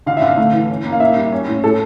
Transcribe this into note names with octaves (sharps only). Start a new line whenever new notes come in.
D3 F5
E5
D3
F5
A3
E3
C#4
A#3
F5
A#3 E5
G3
C#4
A2
A2 A4